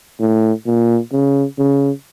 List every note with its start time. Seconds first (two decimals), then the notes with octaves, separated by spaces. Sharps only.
0.20 A2
0.66 A#2
1.12 C#3
1.58 C#3